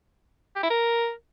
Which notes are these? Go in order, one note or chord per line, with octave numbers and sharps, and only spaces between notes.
G4
E4
A#4